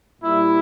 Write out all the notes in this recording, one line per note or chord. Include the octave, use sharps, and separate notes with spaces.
A#2 G3 E4